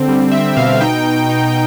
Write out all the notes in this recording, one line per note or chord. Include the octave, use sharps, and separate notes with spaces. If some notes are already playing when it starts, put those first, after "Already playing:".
Already playing: D3 C4
G3
C4 E5
B2 F5
D#4 G5
B2
D#4